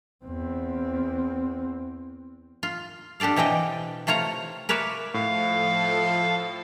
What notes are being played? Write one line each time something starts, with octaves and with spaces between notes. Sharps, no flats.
E2 C4
F4
D4 G4 A4 D5 F5
B2 E3 C4 D#5 G5
C3 A3 F4 C#5 A#5
A#4 B4 C#5 D5 E5
A2 F3 A4 F5